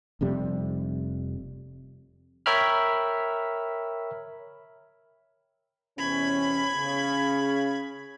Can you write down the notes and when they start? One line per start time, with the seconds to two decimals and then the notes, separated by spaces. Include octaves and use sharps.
0.21 F1 F2 C3 G3
2.46 A#4 C#5 E5 G5 B5 F6
5.98 E2 C3 C#4 B5 G#6
6.76 C#3